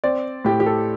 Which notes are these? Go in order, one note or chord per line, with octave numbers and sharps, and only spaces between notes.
C4 D5
A2 G4
G4
A4